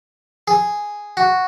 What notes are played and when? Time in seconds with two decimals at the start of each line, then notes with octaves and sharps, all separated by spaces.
0.48 G#4
1.17 F#4